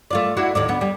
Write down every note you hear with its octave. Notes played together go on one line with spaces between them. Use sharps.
A3 F4 D5
D4 E4 F#4
D#2 A2 D5
D2 B3
G3